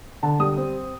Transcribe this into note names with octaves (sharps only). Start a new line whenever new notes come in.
D3 A5
G3 D#6
C4